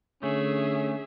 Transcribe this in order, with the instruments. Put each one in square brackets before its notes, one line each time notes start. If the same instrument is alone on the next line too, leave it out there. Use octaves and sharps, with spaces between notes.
[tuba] D3 [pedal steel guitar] A3 [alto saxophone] C#4 [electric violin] G#4 E5